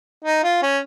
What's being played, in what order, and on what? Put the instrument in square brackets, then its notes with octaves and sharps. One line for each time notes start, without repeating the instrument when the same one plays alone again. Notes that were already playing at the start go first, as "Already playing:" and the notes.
[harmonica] D#4
F4
C#4